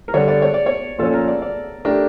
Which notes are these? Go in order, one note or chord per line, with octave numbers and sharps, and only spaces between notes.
A#4
D3 G3 D4 C#5
D5
C#5
D5
C#5
A#2 F3 C#4 A4
A#4
D5
D5
A3 D4 G4 A#4